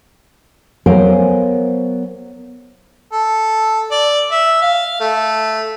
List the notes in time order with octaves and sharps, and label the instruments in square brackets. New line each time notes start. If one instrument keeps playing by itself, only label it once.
[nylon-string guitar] F#3 B3 A#4 C5 F5 G#5
[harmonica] A4
D5
E5
F5
A3